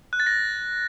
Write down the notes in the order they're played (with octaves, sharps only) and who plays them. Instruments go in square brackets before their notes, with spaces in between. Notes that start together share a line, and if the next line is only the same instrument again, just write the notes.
[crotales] F#6
A6
A#6